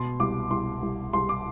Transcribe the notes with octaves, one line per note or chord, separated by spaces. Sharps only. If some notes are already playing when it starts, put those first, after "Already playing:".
Already playing: B2 C6
C2 D6
C2 C6
C2
C2 C6
D6